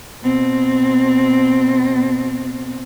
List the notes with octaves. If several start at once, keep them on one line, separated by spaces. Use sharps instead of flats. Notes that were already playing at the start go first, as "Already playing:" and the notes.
B2 C4